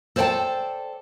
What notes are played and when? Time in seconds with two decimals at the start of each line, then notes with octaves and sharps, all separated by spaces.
0.16 A4 C5 D5 F5 G5 A5